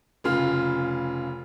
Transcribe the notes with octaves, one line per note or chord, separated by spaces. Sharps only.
F1 C#3 F4 F6